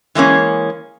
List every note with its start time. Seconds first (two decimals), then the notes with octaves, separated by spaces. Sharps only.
0.15 E3 G#3 A#3 C#4